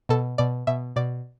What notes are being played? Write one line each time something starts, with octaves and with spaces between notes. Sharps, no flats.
B2 A4
B2 D5
B2 E5
B2 D5